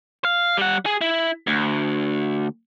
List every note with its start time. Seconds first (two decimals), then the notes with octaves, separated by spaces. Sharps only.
0.25 F5
0.57 G3 F#5
0.86 G#4
1.01 E4
1.47 D2